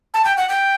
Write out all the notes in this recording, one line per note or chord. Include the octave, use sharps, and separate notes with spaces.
A5
G5
F#5
G5